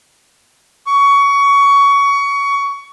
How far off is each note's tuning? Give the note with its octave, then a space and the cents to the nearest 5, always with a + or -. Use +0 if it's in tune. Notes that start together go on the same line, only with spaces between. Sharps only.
C#6 +20